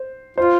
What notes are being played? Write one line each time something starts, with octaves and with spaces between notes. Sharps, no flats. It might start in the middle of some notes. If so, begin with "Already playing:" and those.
Already playing: C5
F4 C5